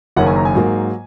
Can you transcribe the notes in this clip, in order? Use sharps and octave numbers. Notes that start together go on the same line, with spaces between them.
F#1 F#2 D#3 A#3 C#4 F#5
G#5
A#5
G#5
G#2 F#3 A#3